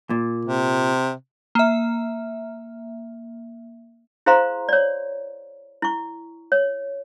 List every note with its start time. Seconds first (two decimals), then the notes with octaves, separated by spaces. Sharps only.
0.10 A#2
0.45 C3
1.55 A#3 E5
4.26 E4 G#4 C5 F5 A#5 C6
4.69 C#5 D5
5.82 E4 C#6
6.52 C#5